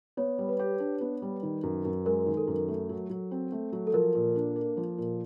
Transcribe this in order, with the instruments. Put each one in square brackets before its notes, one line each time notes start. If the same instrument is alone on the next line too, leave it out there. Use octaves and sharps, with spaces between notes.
[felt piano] B3 [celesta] C#5
[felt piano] G3
[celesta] B4
[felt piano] G4
D4
B3
G3
D#3
F#2
F#2
[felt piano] G#3 [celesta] A#4
[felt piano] D#3
[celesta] A4
[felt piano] F#2
A3
F#3
F#3
C4
A3
F#3
[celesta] A4
[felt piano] F3 [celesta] A#4
[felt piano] A#2
D4
A#3
F3
A#2